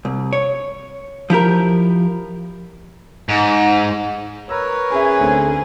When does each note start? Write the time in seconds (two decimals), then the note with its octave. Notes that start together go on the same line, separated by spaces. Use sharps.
0.05 C2
0.33 C#5
1.30 F3 E4 G4 A#4
3.29 G#2
4.49 A#4 B4 C#5 A#5 E6
4.91 C#4 G#4 E5 G#5
5.19 D2 A3 C4